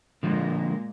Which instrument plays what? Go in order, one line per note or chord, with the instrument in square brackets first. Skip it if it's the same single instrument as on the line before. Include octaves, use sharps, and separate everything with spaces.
[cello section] A#2 G#3 A#3 [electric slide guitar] D3 F3